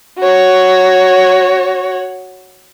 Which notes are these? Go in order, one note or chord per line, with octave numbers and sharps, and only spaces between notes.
F#4 C#5